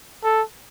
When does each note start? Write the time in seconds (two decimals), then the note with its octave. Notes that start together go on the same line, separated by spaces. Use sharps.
0.24 A4